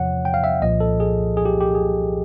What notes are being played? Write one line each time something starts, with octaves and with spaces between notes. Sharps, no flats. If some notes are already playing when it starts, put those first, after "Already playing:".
Already playing: E2 C3 F3 C#5 F#5
G5
F5
E5
C2 A#2 F3 D#5
A4
G#4
G#4
G4
G4
G#4